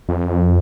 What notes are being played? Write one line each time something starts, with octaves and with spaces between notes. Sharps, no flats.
F2